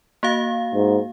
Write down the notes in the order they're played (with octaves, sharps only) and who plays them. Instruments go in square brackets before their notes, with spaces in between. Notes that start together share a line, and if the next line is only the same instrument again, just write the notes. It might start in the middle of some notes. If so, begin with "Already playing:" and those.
[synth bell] A#3 F#4 F5
[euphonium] G#2